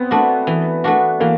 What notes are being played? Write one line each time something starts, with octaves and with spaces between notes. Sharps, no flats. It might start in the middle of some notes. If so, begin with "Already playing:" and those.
Already playing: B3 C4
A3 D4 F#4
E3
A3 D4 F#4
E3 A#3